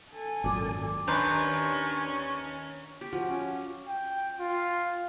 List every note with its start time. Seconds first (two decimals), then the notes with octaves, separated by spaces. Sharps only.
0.11 A4 G#5
0.44 G#1 F#2 A#2 D5 D#6
1.08 D#2 C#4 D4 B4 A#5 C6 G6
3.01 G4
3.13 F3 F#4
3.29 C#4
3.88 G5
4.40 F4